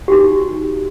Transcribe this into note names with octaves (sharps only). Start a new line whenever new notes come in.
D#4 F#4 G4